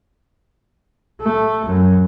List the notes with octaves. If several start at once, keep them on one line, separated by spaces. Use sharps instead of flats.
A3
F#2